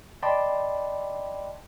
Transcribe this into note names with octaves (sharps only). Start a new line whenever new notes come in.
D5 D#5 G5 A5 B5 C6